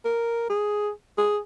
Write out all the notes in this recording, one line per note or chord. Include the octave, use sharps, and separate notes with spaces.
A#4
G#4
G#4